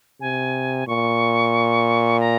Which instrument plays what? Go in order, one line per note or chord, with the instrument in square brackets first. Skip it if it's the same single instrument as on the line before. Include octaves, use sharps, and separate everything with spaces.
[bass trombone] C3 [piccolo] G#5
[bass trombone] A#2 [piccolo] C#6
[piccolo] A#5